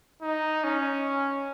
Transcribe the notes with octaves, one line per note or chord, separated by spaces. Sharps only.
D#4
C#4